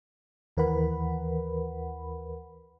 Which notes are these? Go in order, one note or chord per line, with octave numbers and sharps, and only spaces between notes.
D#2 E3 A#4 B4 F#5 B5